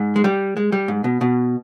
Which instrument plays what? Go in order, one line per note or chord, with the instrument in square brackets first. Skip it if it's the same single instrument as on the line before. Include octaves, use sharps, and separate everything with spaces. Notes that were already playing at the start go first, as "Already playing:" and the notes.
Already playing: [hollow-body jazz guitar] G#2
G#3
G3
G#3
G3
G#2
B2
B2